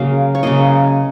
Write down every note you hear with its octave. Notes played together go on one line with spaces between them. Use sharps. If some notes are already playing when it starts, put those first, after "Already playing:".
Already playing: C#3 F#3 A#3 F5
C#5
C#3 F#3 A#3 D#5